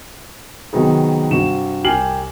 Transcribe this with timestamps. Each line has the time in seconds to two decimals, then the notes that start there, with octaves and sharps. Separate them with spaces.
0.73 C3 D#3 F#3 B3 D#4 G#4
1.31 G2 C3 F#4 E7
1.84 C2 G4 G#5 F6 C7 F#7